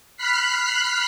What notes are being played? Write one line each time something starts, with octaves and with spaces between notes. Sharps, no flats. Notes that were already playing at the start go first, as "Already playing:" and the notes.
B5 F6 F#6 B6 C7